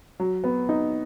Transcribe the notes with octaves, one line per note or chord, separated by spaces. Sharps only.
F#3
B3
D#4